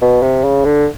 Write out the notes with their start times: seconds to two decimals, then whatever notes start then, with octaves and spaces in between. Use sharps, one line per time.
0.02 B2
0.22 C3
0.44 C#3
0.65 D3